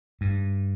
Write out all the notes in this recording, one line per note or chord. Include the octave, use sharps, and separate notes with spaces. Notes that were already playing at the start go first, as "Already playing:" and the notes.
G2